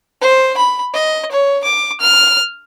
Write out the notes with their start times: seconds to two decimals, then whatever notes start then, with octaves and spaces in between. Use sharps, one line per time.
0.21 C5
0.57 B5
0.94 D#5
1.32 C#5
1.64 D6
2.01 F6